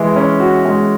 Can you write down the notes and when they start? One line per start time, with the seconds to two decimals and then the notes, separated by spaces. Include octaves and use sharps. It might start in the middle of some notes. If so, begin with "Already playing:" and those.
Already playing: E3 G#3
0.16 C#4
0.40 F#4
0.65 G#3